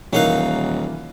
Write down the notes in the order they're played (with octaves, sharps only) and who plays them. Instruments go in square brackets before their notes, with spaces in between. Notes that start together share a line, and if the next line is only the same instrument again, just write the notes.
[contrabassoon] D#1 [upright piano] E3 A#3 F#6 [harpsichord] F#3 D#4 F5